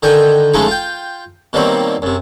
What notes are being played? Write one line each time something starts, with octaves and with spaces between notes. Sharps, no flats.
D3 D#3 D#5 G5 G#5
C#3 F3 G#3 A3 D#4 B4
F4 G5
B2 D#3 F#3 G3 A#3 C4
F#2 C3